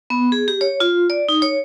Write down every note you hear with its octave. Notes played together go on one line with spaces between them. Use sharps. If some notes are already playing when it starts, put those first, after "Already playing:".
B3
G#4
G4
C#5
F4
D5
D#4
C#5